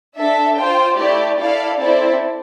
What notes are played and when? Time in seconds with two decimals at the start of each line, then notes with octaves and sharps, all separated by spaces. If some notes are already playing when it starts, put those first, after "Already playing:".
0.17 D4 A4 E5
0.57 F4 C5 G5
0.97 A3 E4 G4 D5
1.38 E4 A4 D5 F5
1.78 C4 E4 A4 D5